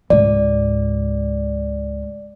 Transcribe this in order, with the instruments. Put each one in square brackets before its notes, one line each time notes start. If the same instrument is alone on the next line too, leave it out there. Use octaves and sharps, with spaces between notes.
[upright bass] C#2 G#2 [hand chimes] D5